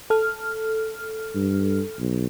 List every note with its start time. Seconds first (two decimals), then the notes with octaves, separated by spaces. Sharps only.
0.10 A4 F6
1.35 G2
1.99 B1